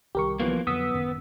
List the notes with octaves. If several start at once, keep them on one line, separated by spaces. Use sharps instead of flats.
C2 D#3 G3 G4 A#4 C#6
E3 F3 A#3 B3
F2 D3 F#3 B3 D#6 E6 B6
A1 F#2 D#3